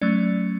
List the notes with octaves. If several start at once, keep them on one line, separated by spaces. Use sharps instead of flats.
F#3 A3 C#4 D5